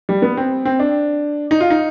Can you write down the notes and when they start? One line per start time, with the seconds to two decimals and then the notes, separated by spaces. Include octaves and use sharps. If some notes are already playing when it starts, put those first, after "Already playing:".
0.09 G3
0.22 B3
0.37 C4
0.65 C4
0.79 D4
1.51 D#4
1.60 F4
1.70 D#4